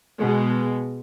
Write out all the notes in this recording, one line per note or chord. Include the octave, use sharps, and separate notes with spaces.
B2 G#3